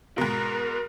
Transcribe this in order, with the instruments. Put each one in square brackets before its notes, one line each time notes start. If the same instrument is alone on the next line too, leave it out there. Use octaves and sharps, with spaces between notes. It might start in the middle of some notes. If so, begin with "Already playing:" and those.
[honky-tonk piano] G#2 B2 [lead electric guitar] A#4